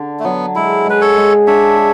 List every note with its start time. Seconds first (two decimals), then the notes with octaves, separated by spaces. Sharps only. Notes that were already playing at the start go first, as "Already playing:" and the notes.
Already playing: D3
0.20 A3
0.24 F#3 B3
0.55 G#3 E4
0.86 G#3 B4
1.01 A4 C#5
1.17 G#3
1.47 D4 C#5 E5
1.77 G#4